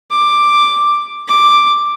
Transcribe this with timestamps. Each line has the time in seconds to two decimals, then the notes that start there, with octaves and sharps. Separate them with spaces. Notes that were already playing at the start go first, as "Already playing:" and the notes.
0.11 D6
1.28 D6